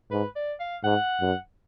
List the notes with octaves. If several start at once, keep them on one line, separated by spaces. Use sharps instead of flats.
G#2 B4
D5
F5
G#2 F#5
F#2